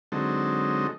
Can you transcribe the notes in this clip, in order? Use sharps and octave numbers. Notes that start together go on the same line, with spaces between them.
D3 F#3 G#3 C4 D#4 A4